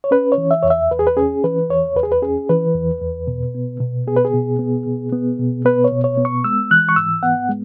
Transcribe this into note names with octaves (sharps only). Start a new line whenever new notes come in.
C#5
C#4 B4
C#5
E3
E5
E2 C#5
E5
E2 B4
G#4
B4
C#4 G#4
E3 B4
E2 C#5
E2 B4
G#4
B4
C#4 G#4
E3 B4
E2
E2
B2
B3
B2
B3 G#4
B4
G#4
B2
B3
B2
B3
B2
B3 B4
C#5
B2
C#5
B3
C#6
G#3 E6
E3 F#6
C#6
G#2 E6
B3 F#5
G#3